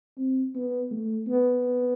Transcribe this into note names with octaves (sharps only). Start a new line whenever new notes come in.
C4
B3
A3
B3